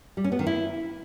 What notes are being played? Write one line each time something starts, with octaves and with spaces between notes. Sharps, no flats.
G3
C#4
B3
D#3
E4